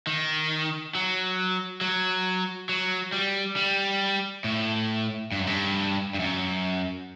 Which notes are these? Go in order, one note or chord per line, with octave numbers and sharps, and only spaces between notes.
D#3
F#3
F#3
F#3
G3
G3
A2
G2
F#2
G2
G2
F#2